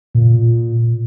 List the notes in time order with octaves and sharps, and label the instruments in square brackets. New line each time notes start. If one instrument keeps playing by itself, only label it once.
[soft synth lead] A#2